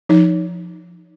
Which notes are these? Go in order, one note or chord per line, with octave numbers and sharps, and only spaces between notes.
F3 D#4